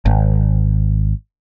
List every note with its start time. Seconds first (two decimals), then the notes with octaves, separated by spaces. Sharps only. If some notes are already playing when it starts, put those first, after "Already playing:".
0.06 G#1